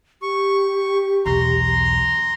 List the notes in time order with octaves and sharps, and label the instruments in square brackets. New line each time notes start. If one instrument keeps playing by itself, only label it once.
[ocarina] G4 [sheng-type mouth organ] C#6
[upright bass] B1 E2 [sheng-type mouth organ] A#5 C6